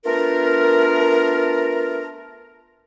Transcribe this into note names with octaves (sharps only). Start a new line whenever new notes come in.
A3 B3 D4 F4 A#4